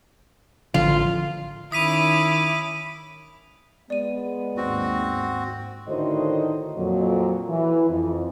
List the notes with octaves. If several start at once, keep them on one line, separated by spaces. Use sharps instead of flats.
A1 D3 F3 F4
D#3 C#4 E4 B5 D6 D#6 B6 D#7
G#3 B3 D5 D#7
D#2 G#2 C4 F#4
A2 D3 D#3 F#4 C5 D#5
F2 A#2 F#3
E3
F2